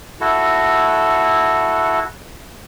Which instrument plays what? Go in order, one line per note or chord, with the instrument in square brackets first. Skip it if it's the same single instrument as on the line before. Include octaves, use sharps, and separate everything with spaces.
[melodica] E4 F#4 A4